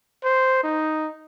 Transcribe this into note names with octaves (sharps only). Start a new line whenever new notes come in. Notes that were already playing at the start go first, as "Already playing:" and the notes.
C5
D#4